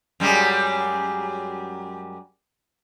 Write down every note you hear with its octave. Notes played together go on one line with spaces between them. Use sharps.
F#2 G3 G#3